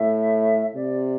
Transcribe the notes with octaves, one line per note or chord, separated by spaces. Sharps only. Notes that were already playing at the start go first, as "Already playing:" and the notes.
Already playing: A2 E5
C3 D5